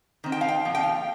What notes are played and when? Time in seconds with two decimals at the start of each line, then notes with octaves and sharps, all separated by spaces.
0.24 D#3 C4
0.32 G5
0.41 F5
0.48 G5
0.65 A#2 F3
0.75 G5
0.83 F5